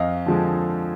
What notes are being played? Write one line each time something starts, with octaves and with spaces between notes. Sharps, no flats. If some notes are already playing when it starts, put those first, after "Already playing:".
Already playing: F2 D#5 F5
D3 F3 G#3